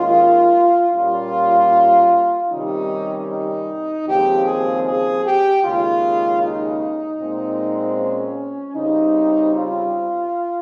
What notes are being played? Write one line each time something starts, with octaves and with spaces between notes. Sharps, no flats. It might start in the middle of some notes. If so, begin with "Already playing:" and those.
Already playing: D#2 D#3 G#3 C#4 F4
A#2 G3 A#3 C#4 F4
C3 D#3 G3 C#4 D#4
D#4
D#2 C#3 F3 G#3 C4 G4
G#4
G#4
G4
D#2 C#3 G#3 F4
D#4
A#2 G#3 C4
C#4
C#3 G3 C4 D#4
F4